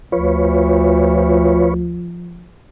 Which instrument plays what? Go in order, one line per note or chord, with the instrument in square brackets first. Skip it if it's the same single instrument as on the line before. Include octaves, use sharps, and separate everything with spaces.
[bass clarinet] D2 [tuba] F3 [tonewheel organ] F4 B4 C#5